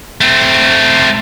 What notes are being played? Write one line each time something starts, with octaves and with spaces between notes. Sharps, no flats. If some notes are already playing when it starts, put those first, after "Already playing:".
A3 C4